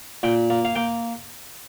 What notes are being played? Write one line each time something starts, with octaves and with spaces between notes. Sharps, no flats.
A#2 G5
A#3
F5
A#3 G5